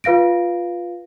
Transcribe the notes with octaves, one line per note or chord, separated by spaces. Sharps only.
F4 B4 F5 A#6 D7